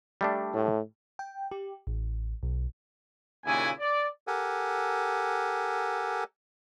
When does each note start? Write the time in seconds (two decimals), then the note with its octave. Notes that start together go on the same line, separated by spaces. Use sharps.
0.21 G3 A3 D4
0.54 A2
1.19 G5
1.51 G4
1.87 A1
2.43 B1
3.45 D#2 A#2 C#3 E4 G#5
3.79 D5
4.27 G4 A4 A#4 F#5 G#5